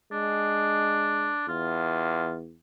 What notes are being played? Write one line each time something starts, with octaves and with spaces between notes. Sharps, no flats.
G#3 D4
E2 F4